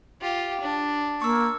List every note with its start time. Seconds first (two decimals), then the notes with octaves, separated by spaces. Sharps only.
0.22 F4 G4
0.61 D4
1.22 A#3 C#6 E6